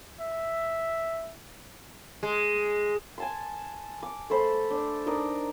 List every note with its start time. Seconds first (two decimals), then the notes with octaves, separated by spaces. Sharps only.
0.21 E5
2.23 G#3
3.18 G#5 A5 C6
4.03 D6
4.30 A3 A4 C5 B5
4.70 D4
5.06 D4 D#4 A#4 D#5